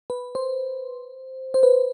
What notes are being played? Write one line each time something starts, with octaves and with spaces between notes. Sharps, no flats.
B4
C5
C5
B4